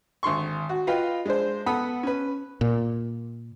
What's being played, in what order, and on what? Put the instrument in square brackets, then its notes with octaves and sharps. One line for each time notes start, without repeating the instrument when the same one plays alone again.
[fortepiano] G#1 D3 C6 C#6
F#4
F4 B4 D#5 F5 G5
G#3 D4 C5
B3 A4 F#5 B5 D#6
C#4 B4
[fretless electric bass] A#2